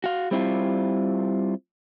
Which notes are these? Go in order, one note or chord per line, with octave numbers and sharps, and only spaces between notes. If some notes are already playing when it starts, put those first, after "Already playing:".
F#4 F5
G3 C4 E4 F4